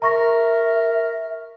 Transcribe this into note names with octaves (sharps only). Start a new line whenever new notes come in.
A#4 E5 A#5 C#6 A#6